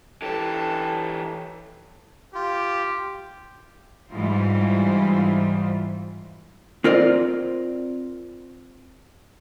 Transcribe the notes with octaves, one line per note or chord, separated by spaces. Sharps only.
E3 G4 A4
F4 G4
G#2 E3 G3 E4 F4 C5
C4 F4 A#4 D5